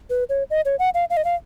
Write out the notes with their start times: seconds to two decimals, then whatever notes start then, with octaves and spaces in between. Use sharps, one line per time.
0.10 B4
0.29 C#5
0.50 D#5
0.65 C#5
0.79 F#5
0.94 F5
1.10 F5
1.17 D#5
1.25 F5